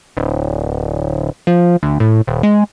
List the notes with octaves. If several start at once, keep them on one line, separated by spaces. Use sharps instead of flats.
D1
F3
D2
A2
D#1
G#3